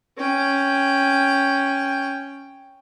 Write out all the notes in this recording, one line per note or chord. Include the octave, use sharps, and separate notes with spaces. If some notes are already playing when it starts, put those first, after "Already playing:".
C#4 G5